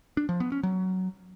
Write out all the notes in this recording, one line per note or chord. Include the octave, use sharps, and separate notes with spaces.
D4
F3
B3
C#4
F#3